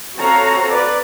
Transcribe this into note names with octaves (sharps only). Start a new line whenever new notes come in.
C4 F#4 A4 C#5 F5 A#5
B4 D5